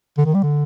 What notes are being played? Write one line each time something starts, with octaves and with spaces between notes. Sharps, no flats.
D3
D#3
G3
D3